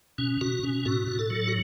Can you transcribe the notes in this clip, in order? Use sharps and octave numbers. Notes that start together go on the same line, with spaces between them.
B2 C#4
B2 F#4
B2 C#4
A2 F#4
A2
A4
F#3
F#4